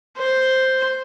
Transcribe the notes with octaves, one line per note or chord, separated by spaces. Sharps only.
C5